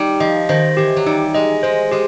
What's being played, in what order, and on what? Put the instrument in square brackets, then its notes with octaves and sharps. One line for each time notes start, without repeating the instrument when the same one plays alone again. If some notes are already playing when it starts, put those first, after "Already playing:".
Already playing: [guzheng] G3 [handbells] D#4
[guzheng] F3 [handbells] D#5
[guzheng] D#3 [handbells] C5
[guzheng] E3 [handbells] G4
[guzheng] F#3
[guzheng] G3 [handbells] D#4
[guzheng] G#3 [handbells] D#5
[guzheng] G#3 [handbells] C5
[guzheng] G#3 [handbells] G4